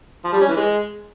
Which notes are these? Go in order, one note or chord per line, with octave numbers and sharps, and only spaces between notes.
F3
G3
C#4
E3
G#3